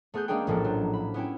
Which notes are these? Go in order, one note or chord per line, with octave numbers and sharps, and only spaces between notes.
A3 B3 G#4 F#6 G6
G#3 A#3 C#4 D4 G#4 G5
A#1 A2 F3 A#3 A4
F#3
B5
B3 C#4 E4 G5